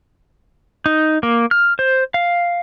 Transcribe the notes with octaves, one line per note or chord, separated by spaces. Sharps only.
D#4
A#3
F6
C5
F5